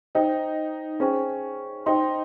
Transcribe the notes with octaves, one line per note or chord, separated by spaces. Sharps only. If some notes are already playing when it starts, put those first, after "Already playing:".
D#4 C5 D#5 G5
C#4 G#4 C5 G5 C#6
D#4 C5 G5 C6